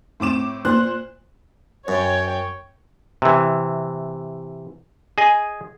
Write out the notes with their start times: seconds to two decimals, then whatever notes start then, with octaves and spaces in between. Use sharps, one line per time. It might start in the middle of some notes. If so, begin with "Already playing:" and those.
0.20 A2 C4 D6 E7
0.65 A#2 C5 F#6
1.88 F#2 C#5 G5
3.22 C3 E3
5.18 G#4 D#5 G#5